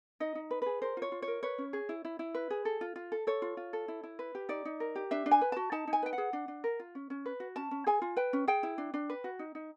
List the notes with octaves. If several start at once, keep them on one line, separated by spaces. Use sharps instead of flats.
D#4 D#5
D#4
B4
G#4 B4
A#4 C5
F4 C#5
F4
C#5
A#4
B4 C#5
C#4
G#4
E4
E4
E4
B4
G#4
A4
F4
F4
A4
A4 C#5
F4
F4
A4
E4
E4
B4
G4
D#4 D5
D#4
A#4
G4
D4 E5
D4
G#5
B4
F#4 A5
D#4 A5
D#4
G#5
B4 G5
F#5
G#4
D4
D4
A#4
F4
C#4
C#4
B4
F#4
C#4 A5
C#4
G#4 G#5
F4
B4 G5
C#4
G#4 G5
E4
D4
D4
B4
F#4
D#4
D#4